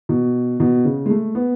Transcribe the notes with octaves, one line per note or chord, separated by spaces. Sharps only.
B2
B2
C#3
G#3
A3
B3